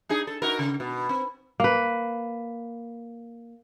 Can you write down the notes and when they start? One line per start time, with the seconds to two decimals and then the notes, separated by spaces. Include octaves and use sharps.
0.09 D4 D#4 G#4
0.27 A4
0.42 D#4 F#4 A#4
0.59 C#3
0.80 B2
1.09 C4
1.60 A#3 B4